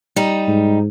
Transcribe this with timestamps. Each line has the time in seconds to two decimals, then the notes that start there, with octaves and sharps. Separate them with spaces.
0.16 G3 D#4
0.48 G#2